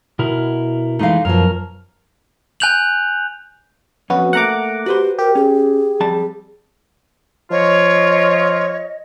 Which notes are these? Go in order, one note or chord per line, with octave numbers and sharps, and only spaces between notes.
B2 E4 A#4
E3 G#3 A3 D#4 F5
F#2 B2 F3 A#4
G#5 F#6 G6 F7 F#7
F2 B3 C#4 F#4
A3 A#3 F#5 A#5 D6
F#4 G4 B4 C5
G4 A#4
C#4 G#4
F2 G3 A5
F3 F4 C#5 D#5